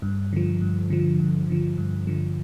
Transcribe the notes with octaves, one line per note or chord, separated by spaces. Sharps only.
G2
D3 F3
G2
D3 F3
G2
D3 F3
G2
D3 F3